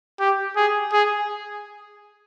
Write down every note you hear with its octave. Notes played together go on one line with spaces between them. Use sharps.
G4
G#4
G#4